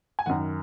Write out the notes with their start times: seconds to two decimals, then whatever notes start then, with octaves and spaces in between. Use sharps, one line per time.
0.19 G#5
0.26 F#2 D#3 F#5